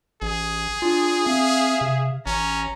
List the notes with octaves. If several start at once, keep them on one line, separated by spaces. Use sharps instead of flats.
A1 G#4
D4 F4
C4 E5 F5
C3
A1 C#4 A#5